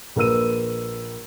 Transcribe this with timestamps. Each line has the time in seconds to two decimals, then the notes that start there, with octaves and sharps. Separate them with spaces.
0.16 A#1 A#4 B4 E6 D#7